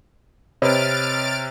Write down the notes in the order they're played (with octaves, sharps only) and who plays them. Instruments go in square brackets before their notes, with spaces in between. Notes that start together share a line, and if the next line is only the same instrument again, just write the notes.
[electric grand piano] C3 [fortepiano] C4 B4 D#5 [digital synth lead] C#5 [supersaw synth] F6 A6 D7